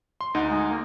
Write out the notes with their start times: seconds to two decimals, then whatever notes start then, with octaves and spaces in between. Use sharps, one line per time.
0.21 C6
0.34 D2 D#4 F#5
0.49 G#3
0.69 A#3